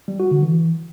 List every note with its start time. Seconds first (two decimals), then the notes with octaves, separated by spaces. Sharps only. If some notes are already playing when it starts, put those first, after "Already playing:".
0.08 G3
0.20 F#4
0.31 D3
0.43 E3